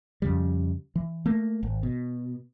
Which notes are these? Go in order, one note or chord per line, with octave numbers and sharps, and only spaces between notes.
F2 C#3 G3
E3
A3 A#3
G#1
B2